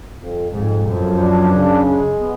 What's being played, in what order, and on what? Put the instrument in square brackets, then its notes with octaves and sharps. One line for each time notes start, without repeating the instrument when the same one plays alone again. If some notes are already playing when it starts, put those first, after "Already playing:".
[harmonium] F2
[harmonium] F2 [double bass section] G#2
[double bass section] F#2 [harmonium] F3
[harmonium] D4
C#3
G#3
B3